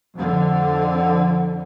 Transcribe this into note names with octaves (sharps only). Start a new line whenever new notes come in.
F2 D3